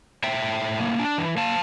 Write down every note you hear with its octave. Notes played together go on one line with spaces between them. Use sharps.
A2 E5 G5
A2
A2
A#3
D4
E3
A#3 F5 A5